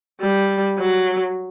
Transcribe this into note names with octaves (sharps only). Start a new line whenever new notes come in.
G3
F#3